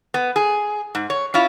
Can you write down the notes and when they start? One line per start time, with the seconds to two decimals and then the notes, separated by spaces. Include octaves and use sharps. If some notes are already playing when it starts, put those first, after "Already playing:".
0.14 B3
0.36 G#4
0.95 G#2
1.10 C#5
1.34 C#4 E4 F4